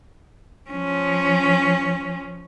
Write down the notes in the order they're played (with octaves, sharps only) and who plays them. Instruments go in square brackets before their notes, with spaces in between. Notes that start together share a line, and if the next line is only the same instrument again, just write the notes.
[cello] F3 C#4